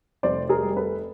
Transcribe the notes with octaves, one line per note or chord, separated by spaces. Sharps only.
F1 C5 D5
G#4 A#4
G3
A4 B4